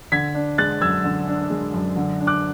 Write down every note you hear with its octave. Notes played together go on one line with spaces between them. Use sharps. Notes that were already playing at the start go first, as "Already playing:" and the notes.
D3 G#6 B6
D4
G#3 F#6 A6
F#2 E6 G#6
D3
D4
G#3
F#2
D3
D4
D6 F#6